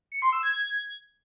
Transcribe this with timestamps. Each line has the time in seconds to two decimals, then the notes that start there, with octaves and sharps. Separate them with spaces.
0.12 C#7
0.22 C6
0.33 E6
0.43 G#6